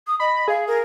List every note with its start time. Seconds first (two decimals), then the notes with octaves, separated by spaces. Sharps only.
0.07 D#6
0.20 D#5 B5
0.48 G#4 F5
0.67 A#4